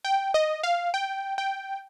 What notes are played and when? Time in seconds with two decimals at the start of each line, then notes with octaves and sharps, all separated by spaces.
0.05 G5
0.34 D#5
0.63 F5
0.94 G5
1.38 G5